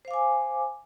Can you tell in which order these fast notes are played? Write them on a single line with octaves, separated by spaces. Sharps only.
C5 F5 D6 G#5